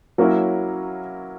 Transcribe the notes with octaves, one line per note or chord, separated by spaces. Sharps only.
F#3 A#3 C#4 E4